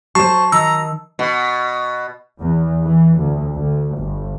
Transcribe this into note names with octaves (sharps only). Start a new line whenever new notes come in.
F#3 C5 A5 C#6 C7
D#3 A#5 E6
B2
E2
E3
D2
D2
G1